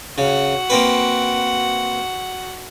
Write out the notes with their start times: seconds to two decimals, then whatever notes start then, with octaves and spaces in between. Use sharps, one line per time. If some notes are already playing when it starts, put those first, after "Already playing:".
0.18 C#3 F#4 F#5
0.70 A#3 C4 B4